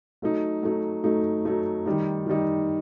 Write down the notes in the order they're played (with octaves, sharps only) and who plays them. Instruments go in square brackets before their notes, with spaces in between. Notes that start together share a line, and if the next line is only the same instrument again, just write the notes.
[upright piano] F#3 A3 D#4
F#3 A3 D#4
F#3 A3 D#4
F#3 A3 D#4
D#3 G3 D#4
D#3 G3 D#4